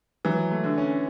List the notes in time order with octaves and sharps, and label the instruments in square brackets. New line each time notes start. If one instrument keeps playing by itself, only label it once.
[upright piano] E3 [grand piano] F#3
[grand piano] A3
[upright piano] D3
[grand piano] C#4